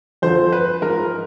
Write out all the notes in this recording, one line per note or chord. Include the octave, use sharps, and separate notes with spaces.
F2 D3 F3 C5
B4
G#2 F3 A#4